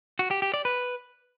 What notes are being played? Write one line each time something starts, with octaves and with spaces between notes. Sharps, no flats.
F#4
G4
G4
D5
B4